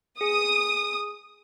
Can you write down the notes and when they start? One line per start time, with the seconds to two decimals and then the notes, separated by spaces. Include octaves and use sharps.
0.21 G#4 D#6